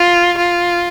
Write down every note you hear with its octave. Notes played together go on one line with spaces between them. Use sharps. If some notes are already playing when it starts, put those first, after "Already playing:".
Already playing: F4
F4